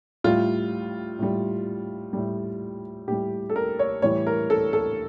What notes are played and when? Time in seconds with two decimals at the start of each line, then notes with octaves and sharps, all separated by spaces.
0.24 A2 G3 F4
1.19 A2 G3
2.13 A2 G3
3.08 A2 G3 G4
3.50 A4
3.56 A#4
3.79 C#5
4.02 A2 E3 G3 C#5
4.27 A#4
4.50 A4
4.73 A4